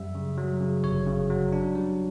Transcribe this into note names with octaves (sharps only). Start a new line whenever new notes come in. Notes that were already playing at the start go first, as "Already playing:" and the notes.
Already playing: F#2 G3 E5
C#3
F#3
C#3
G1 C#5
C#3
F#3
D4
G3